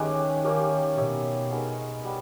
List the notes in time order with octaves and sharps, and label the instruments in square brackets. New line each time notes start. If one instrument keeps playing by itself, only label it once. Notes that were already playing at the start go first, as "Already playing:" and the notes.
Already playing: [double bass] D#3 [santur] G#3 C#4 E4 G4 B4 D#5
[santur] A#3 C#4 G4 A#4
[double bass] B2 [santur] D#4 G4 C#5 E5
[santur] G#3 B3 D#4 A#4
G3 B3